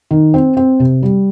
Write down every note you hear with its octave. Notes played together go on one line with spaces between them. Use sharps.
D#3
C4
C4
C3
G3